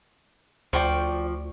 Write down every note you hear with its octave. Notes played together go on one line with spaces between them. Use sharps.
D2 F3 D5 G5 C#6